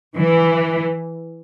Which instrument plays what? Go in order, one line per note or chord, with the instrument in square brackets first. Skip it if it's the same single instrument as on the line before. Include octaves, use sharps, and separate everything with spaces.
[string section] E3